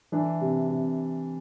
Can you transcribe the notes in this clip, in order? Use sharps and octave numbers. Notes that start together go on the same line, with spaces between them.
E3 D4
C3
C3